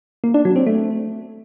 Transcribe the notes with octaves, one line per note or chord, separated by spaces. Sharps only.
A#3
D4
F#3
C4
A3